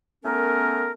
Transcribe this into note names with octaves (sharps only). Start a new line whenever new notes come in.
A3 B3 C#4 A#4